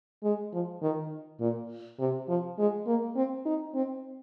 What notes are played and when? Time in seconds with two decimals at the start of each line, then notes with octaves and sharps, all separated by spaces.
0.23 G#3
0.53 F3
0.82 D#3
1.40 A#2
2.00 C3
2.29 F3
2.58 G#3
2.87 A#3
3.16 C4
3.46 D#4
3.74 C4